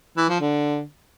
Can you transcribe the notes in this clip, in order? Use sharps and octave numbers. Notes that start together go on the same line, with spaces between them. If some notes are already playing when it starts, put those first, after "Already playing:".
E3
F3
D3